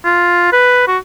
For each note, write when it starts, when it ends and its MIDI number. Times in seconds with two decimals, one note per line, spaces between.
0.05 0.51 65
0.52 0.86 71
0.87 0.98 66